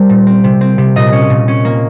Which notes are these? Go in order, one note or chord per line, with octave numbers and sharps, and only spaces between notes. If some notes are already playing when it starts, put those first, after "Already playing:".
Already playing: G3 A#4 C5
A#2
C4
C3
C4
C3
A#2 D#5
C#4
A#2
C#4
A#3